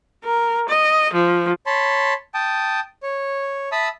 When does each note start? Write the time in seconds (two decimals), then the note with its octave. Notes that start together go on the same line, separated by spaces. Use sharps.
0.25 A#4
0.68 D#5
1.13 F3
1.66 C#5 A5 B5 C6
2.34 G5 A5 D#6
3.03 C#5
3.72 E5 A5 B5 D#6 E6